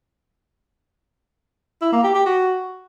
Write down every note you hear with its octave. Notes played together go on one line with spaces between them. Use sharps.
E4
A#3
G4
G4
F#4